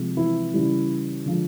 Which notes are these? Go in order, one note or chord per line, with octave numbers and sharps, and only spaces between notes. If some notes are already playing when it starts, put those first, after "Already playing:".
Already playing: C3 F3 G#3
E3 E4
C#3 E3 G3
D3 F3 G#3